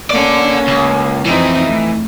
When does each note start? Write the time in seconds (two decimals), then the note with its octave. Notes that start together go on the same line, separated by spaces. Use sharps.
0.10 A#3 C#4 A4 D5
0.68 C#2
1.26 F2 E3 C4 D#4
1.66 A3